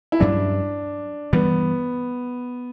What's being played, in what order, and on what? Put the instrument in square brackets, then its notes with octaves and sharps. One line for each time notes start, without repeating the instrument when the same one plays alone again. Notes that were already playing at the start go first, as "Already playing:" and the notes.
[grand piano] E4
[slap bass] G2 F#3 C#4 [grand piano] D4
[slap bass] G2 E3 G3 [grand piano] B3